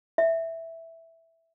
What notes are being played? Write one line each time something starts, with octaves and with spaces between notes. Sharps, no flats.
E5